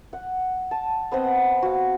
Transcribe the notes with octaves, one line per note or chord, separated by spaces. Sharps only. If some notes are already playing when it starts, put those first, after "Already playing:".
F#5
A5
B3 C4 D#5 F#5
F#4 F5